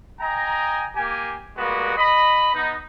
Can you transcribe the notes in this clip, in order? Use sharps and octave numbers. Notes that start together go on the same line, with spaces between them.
D#5 G5 G#5 A#5
A#3 G4 G#5
G3 G#3 A#3 B3 F#4
D#5 B5
B3 D#4